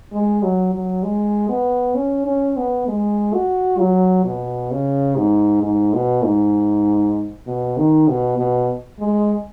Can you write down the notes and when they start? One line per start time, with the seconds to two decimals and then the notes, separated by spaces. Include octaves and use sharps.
0.13 G#3
0.43 F#3
0.74 F#3
1.03 G#3
1.49 B3
1.95 C#4
2.26 C#4
2.57 B3
2.88 G#3
3.33 F#4
3.79 F#3
4.25 B2
4.71 C#3
5.17 G#2
5.62 G#2
5.94 B2
6.24 G#2
7.47 B2
7.78 D#3
8.08 B2
8.38 B2
9.00 G#3